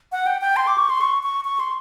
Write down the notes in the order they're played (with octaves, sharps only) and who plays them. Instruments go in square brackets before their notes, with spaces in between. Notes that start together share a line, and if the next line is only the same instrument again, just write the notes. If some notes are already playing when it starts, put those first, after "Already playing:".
[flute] F#5
G5
G5
C6
D6
C#6
C6
C#6
C#6
C#6
C6